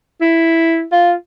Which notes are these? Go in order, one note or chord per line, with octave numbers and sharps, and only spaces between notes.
E4
F4